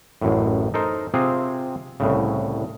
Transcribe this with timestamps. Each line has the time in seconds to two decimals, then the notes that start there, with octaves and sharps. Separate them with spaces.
0.21 A1 F#2 A2
0.74 D#4 A4 A#4 C5
1.14 C3 C4 F4 G#4
2.00 C2 A2 C#3